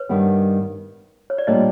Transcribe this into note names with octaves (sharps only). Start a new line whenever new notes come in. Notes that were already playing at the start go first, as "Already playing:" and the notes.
Already playing: B4 C#5
G2 D#3 G3 B3
C#5
D5
A#2 G3 A#3 D4 C#5 D#5